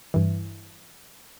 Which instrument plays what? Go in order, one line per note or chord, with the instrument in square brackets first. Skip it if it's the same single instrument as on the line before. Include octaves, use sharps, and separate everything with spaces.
[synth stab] G2 E3